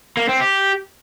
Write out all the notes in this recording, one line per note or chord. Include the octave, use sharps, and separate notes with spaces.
A#3
C4
G4